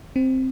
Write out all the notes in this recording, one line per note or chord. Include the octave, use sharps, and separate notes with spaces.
C4